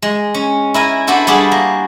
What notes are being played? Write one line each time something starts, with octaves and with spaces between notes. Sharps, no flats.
G#3
C#4
E4 A#4 G#5
B3 D4 E4 F#4 A4 C5
G3 D4 F#4 G#4 A4
A#3